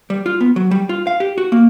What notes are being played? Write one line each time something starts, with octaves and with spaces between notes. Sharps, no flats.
G3
F4
B3
F#3
G3
F4
F5
G4
F#4
A#3